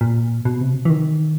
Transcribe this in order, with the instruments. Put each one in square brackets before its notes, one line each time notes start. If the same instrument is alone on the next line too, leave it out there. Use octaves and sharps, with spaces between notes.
[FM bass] A#2
B2
C3
E3
D#3